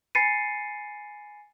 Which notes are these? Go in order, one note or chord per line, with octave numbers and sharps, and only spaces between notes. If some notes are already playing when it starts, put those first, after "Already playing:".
G#5 B5 A6 C7 C#7 D#7